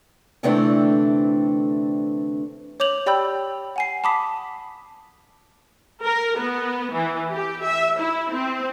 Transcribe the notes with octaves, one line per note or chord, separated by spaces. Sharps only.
D2 C3 E3 A3 C4 D4
C#5 D6 G6 F7 F#7
G4 D5 G5 B5 E6 G6
F#5 G#5 C7
A5 B5 D6 D#6 B6
A#4
B3
E3
G4
E5
E4
C4